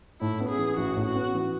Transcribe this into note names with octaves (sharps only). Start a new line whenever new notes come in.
A2 E4
B3
G#4
E3
A1 F#4
A2
F#4
B3
E3